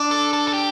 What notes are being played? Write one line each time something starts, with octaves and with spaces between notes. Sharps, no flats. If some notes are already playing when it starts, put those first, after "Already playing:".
Already playing: D4
A4
A4
A4
G4